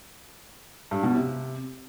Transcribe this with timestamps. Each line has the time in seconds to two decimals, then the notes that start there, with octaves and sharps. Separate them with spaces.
0.91 G2
1.03 B2
1.15 C3